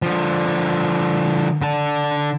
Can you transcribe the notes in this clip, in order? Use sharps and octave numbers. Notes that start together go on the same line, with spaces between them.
D3 F3
D3 A5